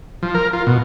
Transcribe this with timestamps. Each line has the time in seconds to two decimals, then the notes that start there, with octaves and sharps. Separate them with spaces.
0.23 F3
0.35 A#4
0.53 F4
0.67 B2